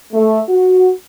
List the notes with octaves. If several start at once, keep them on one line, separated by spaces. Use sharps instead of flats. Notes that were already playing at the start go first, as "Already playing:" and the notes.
A3
F#4